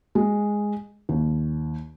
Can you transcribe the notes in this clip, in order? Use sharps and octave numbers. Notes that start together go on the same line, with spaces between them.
G#3
D#2